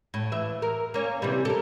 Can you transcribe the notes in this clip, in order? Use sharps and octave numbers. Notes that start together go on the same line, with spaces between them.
A2
E3 E5
A#4
A#3 C#4
C3 E3 G3
A4 A#4